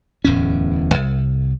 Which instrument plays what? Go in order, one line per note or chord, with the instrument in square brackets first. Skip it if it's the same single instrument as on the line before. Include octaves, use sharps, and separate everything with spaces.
[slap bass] D1 E2 A2 C#4
C2